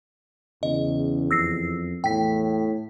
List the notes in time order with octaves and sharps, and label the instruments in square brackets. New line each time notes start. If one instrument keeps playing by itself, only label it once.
[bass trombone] E2 [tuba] C#3 [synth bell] D#5
[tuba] F2 [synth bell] E6 A#6 C7
[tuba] E2 [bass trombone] A2 [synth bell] G5 B6